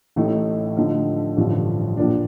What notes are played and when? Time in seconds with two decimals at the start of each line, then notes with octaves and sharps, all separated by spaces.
0.16 A1 A2 A3 D#4
0.77 D3 F3 A3 D#4
1.37 A1 G2 D3 F3
1.97 A#1 A#2 F3 A#3 D4